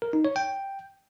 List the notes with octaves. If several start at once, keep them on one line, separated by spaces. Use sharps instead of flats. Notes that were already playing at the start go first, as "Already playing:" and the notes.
A#4
D#4
C#5
G5